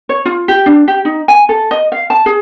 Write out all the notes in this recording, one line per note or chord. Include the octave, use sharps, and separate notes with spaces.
C#5
F4
G4
D4
G4
D#4
G#5
A4
D#5
F5
A5
G#4